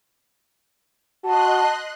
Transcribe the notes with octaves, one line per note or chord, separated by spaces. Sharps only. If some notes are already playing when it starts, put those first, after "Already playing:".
F#4 D#5 A5 C6 F#6